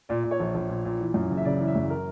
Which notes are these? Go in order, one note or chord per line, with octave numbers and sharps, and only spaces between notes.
A#2 D5
A#2
C#5
A#1
A#1
A#2
A#2
E3
F#2
F#1
E5
C#3 D5
E3
E5
F#2
A#4